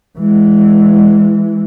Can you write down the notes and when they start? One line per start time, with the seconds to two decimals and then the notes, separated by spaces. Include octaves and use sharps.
0.19 E3 G#3